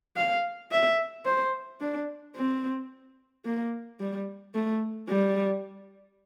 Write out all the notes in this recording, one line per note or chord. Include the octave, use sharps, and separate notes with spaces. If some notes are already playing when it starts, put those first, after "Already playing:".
F5
E5
C5
D4
C4
A#3
G3
A3
G3